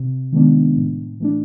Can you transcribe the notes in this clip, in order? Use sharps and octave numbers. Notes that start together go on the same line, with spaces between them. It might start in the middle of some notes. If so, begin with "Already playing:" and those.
Already playing: C3
D#3 G#3 B3 D4
A2
E3 A3 D4